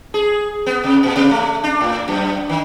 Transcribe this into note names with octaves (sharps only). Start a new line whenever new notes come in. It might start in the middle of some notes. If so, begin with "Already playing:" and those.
G#4
B3
C3
A#2
C3
A3
D4
A2
F#2
D#3